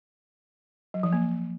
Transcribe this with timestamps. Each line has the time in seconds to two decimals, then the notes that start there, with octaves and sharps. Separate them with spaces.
0.94 F#3
1.03 F3
1.13 A#3